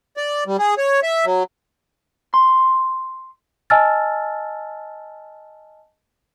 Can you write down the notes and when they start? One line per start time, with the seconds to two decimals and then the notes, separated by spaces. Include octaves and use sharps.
0.17 D5
0.47 G3
0.59 G#4
0.78 C#5
1.03 E5
1.25 F#3
2.34 C6
3.70 D#5 G#5 A5 E6 F6 A6